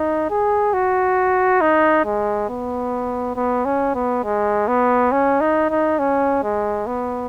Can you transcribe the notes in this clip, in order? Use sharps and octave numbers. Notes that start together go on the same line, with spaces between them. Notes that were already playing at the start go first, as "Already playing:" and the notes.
Already playing: D#4
G#4
F#4
D#4
G#3
B3
B3
C#4
B3
G#3
B3
C#4
D#4
D#4
C#4
G#3
B3